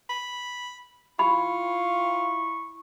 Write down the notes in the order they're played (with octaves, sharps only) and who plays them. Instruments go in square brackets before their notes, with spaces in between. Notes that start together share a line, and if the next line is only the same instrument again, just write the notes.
[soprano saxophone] B5
[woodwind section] E4 C#6 [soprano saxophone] F4 [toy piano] B5